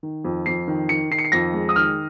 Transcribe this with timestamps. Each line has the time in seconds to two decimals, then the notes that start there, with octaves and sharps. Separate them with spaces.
0.03 D#3
0.24 F2
0.46 F2 C7
0.68 D#3
0.89 D#3 C#7
1.11 D#3 C7
1.19 C#7
1.25 C7
1.32 F2 A#6
1.53 G#3
1.69 D#6
1.76 D#3 F6